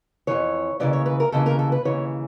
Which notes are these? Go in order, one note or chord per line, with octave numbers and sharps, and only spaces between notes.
F2 C3 E3 C#5
D#2 C#3 E3 D5
C#5
B4
A#4
D#2 C#3 E3 A4
A#4
A4
B4
D#2 C#3 E3 C#5